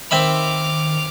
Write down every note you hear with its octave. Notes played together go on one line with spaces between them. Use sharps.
D#3 C4 E5 B5 D6 F6